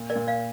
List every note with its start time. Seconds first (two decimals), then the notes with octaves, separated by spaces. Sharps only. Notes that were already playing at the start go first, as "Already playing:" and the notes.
Already playing: A#2 A#3
0.10 A#4 D5
0.15 A#2
0.27 D5 F5